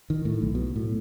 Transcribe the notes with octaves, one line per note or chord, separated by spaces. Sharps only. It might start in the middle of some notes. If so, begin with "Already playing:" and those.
D#3
A2
B1
B2
A2